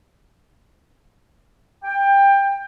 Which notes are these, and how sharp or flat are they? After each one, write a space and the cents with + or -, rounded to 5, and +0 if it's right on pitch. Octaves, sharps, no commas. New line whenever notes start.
G5 +20